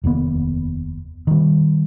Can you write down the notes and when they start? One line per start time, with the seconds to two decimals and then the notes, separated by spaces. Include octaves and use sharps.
0.04 F1 D#2 A2 B3
1.27 D#3 G3